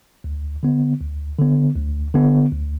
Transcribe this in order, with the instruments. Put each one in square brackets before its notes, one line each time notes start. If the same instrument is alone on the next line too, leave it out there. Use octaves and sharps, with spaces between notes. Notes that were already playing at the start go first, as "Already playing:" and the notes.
[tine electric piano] D2
D3 B3
D2
D3 B3
D2
D3 B3
D2